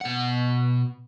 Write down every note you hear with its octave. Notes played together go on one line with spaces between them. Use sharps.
B2 F#5